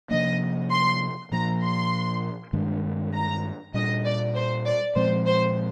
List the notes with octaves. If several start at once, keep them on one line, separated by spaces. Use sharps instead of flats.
C3 F3 A#3 D4 D#5
C6
A#2 F3 A#3 A#5
C6
G2 D#3 G#3 D4
A#5
A#2 G3 D4 D#5
D5
C5
D5
A#2 F3 G#3 C4 C5
C5